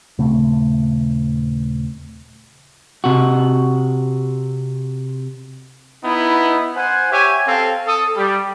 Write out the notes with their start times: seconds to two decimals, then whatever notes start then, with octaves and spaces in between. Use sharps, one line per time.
0.18 D#1 C#3 A3 C4
3.04 C3 F#4
6.04 B3 D#4 E4
6.76 C5 F#5 G#5
7.12 G4 C#5 E5 G#5
7.47 C4 A4 F5
7.87 A4 D#6
8.16 G3